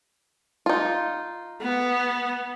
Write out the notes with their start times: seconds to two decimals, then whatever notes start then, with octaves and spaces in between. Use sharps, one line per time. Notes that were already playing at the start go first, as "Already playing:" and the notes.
0.66 D#4 F4
1.61 B3